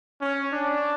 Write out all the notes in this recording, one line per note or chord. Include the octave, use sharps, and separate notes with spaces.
C#4
D4